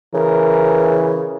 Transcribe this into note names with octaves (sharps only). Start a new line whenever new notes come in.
C#3 E3 A#4